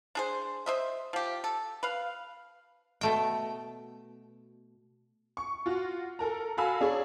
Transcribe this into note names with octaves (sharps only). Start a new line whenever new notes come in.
D4 G#4 C5
C5 D#5 E5
F3 G4
A4
B4 F5
B2 A3 G5
C#6
F4 F#4
A4 A#4 A#5
F#4 A4 F5 G#5 B5 E6
D4 G#4 C#5